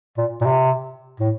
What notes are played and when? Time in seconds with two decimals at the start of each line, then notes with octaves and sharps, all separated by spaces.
0.17 A#2
0.41 A#2
0.46 C3
1.20 A2